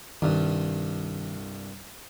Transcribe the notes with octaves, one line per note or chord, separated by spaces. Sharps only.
C2 G2 D#3